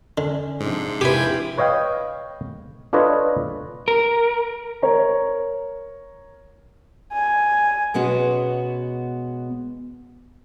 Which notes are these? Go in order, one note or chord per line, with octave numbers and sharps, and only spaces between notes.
D3 C#4
G#2 C3 F3 D4
C3 C4 E4 F4 G4 B4 G5 G#5
B4 C#5 D#5 F5 G5
D4 F4 A4 B4 C#5 D#5
A#4
A#4 C#5 A#5
G#5
B2 G#3 B3 C#4 F#4